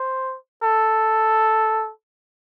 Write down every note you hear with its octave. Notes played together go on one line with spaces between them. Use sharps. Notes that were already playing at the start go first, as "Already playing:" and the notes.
Already playing: C5
A4